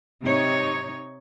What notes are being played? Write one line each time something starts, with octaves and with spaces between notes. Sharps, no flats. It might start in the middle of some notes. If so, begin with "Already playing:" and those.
C3 D#4 C#5